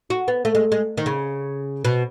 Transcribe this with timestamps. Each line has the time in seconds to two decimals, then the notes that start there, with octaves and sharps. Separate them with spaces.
0.10 F#4
0.28 B3
0.45 A3
0.55 G#3
0.72 G#3
0.97 D#3
1.06 C#3
1.85 B2